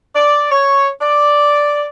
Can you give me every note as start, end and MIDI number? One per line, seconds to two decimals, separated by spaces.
0.16 0.47 74
0.52 0.89 73
1.01 1.86 74